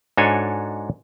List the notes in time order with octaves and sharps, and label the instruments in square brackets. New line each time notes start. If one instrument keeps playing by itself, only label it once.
[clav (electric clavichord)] G#2 D4 F#4 A4 C#5 G#5